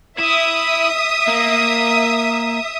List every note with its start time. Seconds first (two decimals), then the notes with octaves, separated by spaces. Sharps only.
0.19 E4 E5 D#6
1.28 A#3